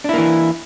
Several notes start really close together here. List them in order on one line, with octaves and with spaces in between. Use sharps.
D4 E4 A#3 E3